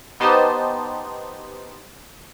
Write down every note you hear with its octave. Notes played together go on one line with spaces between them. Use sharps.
B3 D#4 G4 C5 A5